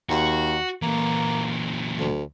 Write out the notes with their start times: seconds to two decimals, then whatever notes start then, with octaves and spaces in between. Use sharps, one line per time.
0.09 D#2 F#4
0.82 A#2 E3 A#3
2.00 D2